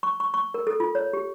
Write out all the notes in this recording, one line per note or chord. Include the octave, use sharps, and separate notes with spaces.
C#6
C#6
C#6
A#4
A4
F4
C#5
G4